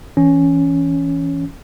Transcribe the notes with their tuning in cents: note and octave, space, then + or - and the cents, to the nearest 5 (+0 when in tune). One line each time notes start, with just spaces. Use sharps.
E3 -5 C#4 +5